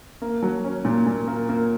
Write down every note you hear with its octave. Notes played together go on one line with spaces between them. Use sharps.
A#3
F#3
C#4
A#2
A#2
A#3
A#3